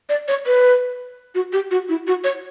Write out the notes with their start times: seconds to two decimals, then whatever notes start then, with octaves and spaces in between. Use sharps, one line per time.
0.09 D5
0.28 C#5
0.46 B4
1.35 F#4
1.53 G4
1.71 F#4
1.89 E4
2.07 F#4
2.24 C#5